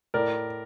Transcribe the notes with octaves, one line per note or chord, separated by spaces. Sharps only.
A2 A#4 D5